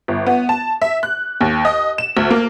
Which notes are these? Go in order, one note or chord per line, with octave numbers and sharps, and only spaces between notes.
G1
B3
A5
E5
F#6
D#2
D#5
E7
D2
A#3